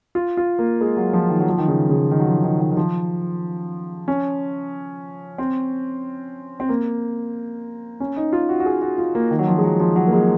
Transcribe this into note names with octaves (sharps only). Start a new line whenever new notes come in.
F4
F4
A#3
G#3
F#3
F3
D#3
F#3
F3
D#3
C#3
C#3
D#3
F#3
F3
D#3
D#3
D#3
F3
C#4
C4
C4
A#3
C#4
D#4
F4
F#4
F#4
G#4
F#4
F4
A#3
D#3
F#3
F3
G#3
F#3
F3
F#3
A#3
G#3